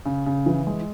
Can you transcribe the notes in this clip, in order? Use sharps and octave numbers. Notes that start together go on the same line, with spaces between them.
C#3
C#3
E3
G#3